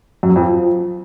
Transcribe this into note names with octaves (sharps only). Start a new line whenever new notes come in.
F#2
F#3
F2
F3